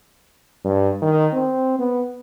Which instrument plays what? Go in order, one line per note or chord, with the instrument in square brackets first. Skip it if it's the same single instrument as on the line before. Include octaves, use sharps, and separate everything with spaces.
[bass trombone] G2
D#3
C4
B3